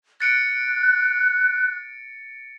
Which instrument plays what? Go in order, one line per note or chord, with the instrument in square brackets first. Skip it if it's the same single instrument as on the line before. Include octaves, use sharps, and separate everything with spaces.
[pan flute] F#6 [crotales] A6 C#7 D7